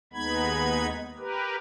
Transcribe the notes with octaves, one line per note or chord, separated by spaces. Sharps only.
D#2 G#3 B3 D#4 B5 G#6
G4 A#4 B4